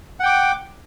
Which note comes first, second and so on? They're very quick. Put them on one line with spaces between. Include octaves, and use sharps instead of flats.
F#5 G5 D6